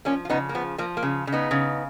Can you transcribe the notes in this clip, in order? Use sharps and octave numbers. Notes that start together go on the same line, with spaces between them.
F3 A#3 C#4
F4
C#3 B3 D#4
A#3
F3 B3
F3 A#3
A#3
C#3
C#3
B3 D#4
C#3